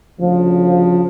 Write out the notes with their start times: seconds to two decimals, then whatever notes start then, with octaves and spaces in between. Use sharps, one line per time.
0.20 D2 C#3 F3